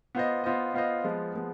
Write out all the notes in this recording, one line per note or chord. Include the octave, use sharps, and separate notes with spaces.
B3 F4 C5 D#5
B3 F4 C5 D#5
B3 F4 C5 D#5
F3 G#3 B3
F3 G#3 B3